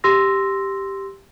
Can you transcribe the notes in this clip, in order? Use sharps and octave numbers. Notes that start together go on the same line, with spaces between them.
G4 C6 E6 A#6